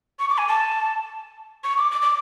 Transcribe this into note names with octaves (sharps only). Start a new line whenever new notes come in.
C#6
D6
G#5
A5
C#6
D6
D6
D6